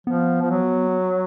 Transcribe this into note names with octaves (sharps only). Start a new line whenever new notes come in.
F3 B3
F3
F#3